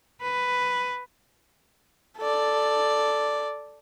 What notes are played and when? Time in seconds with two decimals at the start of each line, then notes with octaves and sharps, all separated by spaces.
0.22 B4
2.18 A4 D5